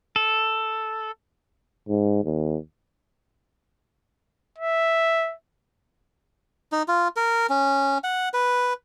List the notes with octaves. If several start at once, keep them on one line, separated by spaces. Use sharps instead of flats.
A4
G#2
D#2
E5
D#4
F4
A#4
C#4
F#5
B4